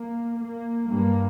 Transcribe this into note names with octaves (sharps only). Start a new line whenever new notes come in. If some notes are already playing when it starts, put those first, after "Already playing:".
Already playing: A#3
A#3
G2 A#3